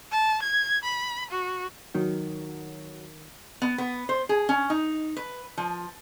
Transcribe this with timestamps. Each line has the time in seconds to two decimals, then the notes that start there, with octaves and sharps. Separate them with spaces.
0.11 A5
0.42 G#6
0.84 B5
1.31 F#4
1.95 D#3 F#3
3.62 B3
3.78 B3
4.09 C5
4.29 G#4
4.49 C#4
4.70 D#4
5.17 B4
5.58 F3